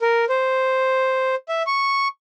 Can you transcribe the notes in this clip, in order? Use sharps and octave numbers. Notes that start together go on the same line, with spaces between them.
A#4
C5
E5
C#6